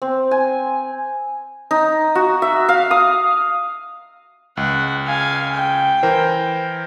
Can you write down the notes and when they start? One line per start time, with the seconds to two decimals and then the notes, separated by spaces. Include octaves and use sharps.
0.02 C4
0.31 G#5
1.71 D#4
2.15 F#4
2.42 E5
2.69 F5
2.91 D#6
4.57 C#2 F#5
5.06 F5 G#5
5.54 G5
6.03 E3 A#4 C5